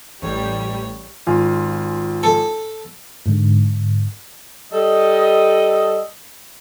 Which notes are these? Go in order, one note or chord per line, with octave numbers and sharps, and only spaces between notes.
A1 G3 C#5
G#1 F4 G#5
A4
G#2 D3
G3 A4 D#5